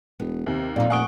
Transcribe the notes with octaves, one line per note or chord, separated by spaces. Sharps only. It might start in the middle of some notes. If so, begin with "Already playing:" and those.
E1 B3
D#2 C3
F2 A#2 D#4 D5 F5
F1 F#5 G#5 C#6 D#6 D7 G7